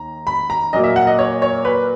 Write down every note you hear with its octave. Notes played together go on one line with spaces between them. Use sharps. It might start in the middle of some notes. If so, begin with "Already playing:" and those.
Already playing: D#2 A#5
B5
A#5
A#2 F#3 A#3 D#5
E5
F#5
D#5
C#5
C#5
B4